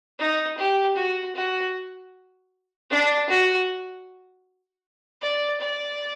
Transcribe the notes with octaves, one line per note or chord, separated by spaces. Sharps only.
D#4
G4
F#4
F#4
D4
F#4
D5
D5